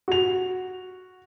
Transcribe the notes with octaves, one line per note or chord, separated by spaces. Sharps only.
F#4 F7